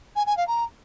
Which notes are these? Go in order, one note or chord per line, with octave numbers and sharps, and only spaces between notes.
G#5
G#5
F5
A#5